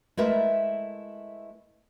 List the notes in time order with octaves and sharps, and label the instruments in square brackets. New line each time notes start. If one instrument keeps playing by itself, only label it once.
[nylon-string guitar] G#3 A3 E4 A#4 B4 E5